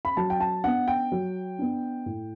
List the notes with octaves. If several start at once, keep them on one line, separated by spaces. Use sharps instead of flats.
B5
F#3 A5
G5
A5
B3 D4 F#5
G5
F#3
B3 D4
A2